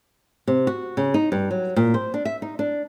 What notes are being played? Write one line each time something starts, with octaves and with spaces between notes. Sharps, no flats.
C3
F#4
C#3
D#4
G2
F#3
A#2
C5
D4
E5
D#4
D4